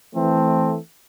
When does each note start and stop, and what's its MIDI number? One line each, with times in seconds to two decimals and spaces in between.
0.15 0.75 52
0.15 0.75 57
0.15 0.75 60